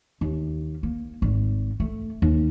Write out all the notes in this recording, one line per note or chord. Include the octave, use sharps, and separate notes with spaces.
D#2
A#3
G#1
A3
D#2